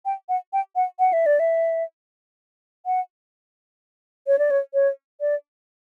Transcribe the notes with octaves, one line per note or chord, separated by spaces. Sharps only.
G5
F#5
G5
F#5
F#5
E5
D5
E5
F#5
C#5
D5
C#5
C#5
D5